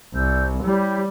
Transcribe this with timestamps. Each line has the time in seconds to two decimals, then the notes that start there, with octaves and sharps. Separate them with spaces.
0.14 C2 D5 E6 G6
0.64 G3 E4 G4 C#5